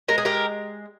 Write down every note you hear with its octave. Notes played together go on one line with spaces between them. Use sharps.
G#3 A#4
G#4
G4 A#4